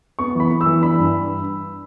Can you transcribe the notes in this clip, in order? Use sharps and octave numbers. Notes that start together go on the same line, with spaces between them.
B3 C#6
E3 B5
B3
E6
E3
D4 B5
G2